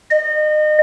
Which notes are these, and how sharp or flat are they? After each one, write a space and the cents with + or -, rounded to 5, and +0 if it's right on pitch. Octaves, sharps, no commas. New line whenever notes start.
D#5 -35